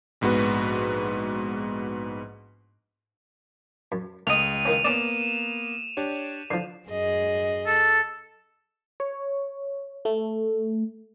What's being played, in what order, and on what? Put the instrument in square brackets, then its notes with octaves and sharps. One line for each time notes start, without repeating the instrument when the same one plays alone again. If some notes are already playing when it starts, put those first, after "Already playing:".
[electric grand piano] A#1 G#2 B3 F#4 B4
[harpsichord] F#2
[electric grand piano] C#2 [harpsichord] A3 D#5 [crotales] D#7 F7
[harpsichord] D#3 A#3 C#4
[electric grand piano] A#3 B3 D7 [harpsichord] C#4 D5 [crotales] E7
[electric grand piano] D4 G4 C#5
[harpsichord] D3 F3 [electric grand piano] C7
[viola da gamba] F#2 G#4 D#5
[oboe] A4
[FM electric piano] C#5
A3